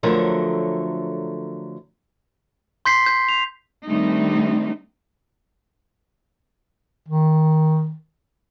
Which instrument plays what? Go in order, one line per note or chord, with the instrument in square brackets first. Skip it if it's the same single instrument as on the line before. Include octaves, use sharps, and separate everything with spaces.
[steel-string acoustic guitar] D3 F3 F#3 A3 A#4 C#5
[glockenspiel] C6 G6 B6 C7
G6
F7
[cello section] D#3 G3 A3 C4 D4 D#4
[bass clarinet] D#3